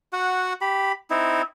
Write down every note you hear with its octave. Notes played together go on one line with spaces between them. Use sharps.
F#4 F#5
G4 B5
C4 D#4 E4